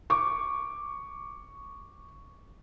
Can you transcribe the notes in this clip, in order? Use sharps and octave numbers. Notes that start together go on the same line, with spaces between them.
C#6 D6